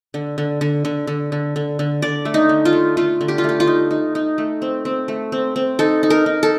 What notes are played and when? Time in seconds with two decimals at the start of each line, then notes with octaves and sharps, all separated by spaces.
0.14 D3
0.38 D3
0.61 D3
0.85 D3
1.07 D3
1.32 D3
1.56 D3
1.79 D3
2.02 D3 D5
2.25 A3
2.34 D#4
2.49 D3
2.65 F4
2.73 A3
2.97 A3 F4
3.21 D3
3.28 G4
3.38 F4
3.44 A3 G4
3.60 F4
3.67 D#4
3.91 D#4
4.15 D#4
4.38 A3
4.62 C4
4.85 C4
5.08 A3
5.32 C4
5.56 C4
5.79 D#4 A4
6.03 D#4
6.10 A#4
6.26 D#4
6.43 A4